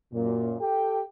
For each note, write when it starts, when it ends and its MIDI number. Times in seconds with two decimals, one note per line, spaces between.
0.13 0.54 42
0.13 0.54 46
0.60 1.01 67
0.60 1.01 69
0.60 1.01 79